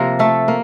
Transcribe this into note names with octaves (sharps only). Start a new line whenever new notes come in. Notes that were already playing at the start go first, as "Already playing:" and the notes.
Already playing: C3 F3 A#3 A#4
A3 A4
A#3